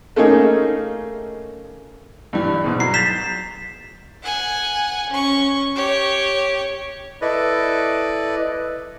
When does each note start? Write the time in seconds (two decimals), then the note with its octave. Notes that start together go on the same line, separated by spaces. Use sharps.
0.16 A3 A#3 C#4 D#4 G#4
2.33 G2 E3 G3
2.64 G#2 B2
2.80 F#3 C7
2.94 G6 A6 B6 E7 F7
4.23 F#5 G#5
5.10 C#4 C#6
5.75 G4 C#5
7.22 E4 A4 B4 D5 D#5